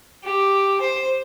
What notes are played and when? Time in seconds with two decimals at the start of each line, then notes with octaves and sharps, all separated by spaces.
0.24 G4
0.80 C5